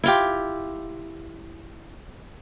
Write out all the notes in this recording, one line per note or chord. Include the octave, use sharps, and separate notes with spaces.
E4 F4 G4